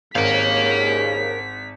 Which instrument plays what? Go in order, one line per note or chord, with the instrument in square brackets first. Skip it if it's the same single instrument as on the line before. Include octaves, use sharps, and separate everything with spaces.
[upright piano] G#1 [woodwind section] D#2 C#3 [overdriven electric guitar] A#4 F5 [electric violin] B6